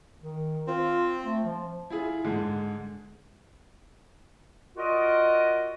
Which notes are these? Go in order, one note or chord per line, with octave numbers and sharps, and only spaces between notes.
D#3
C4 F4
A3
F3
E4 F4 G#4
G#2 D3 G#3
F4 F#4 A#4 D5 D#5